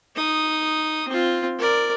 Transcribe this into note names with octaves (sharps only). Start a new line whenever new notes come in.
D#4 D#6
C4 F4
A#4 D5